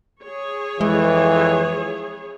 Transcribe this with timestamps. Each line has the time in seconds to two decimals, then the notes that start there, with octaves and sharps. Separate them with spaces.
0.24 G#4 C#5
0.81 F2 E3 G#3